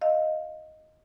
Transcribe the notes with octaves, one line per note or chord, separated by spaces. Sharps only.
D#5 F5